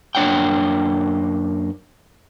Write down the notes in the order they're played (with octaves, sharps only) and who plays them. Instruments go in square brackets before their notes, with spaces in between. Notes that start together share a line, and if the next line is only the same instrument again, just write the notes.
[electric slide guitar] F#2 A#3 D4 C#5 F#5 G5